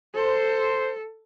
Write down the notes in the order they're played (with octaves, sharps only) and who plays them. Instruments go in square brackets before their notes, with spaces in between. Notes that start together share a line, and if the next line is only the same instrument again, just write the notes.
[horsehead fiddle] A4 [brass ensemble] C5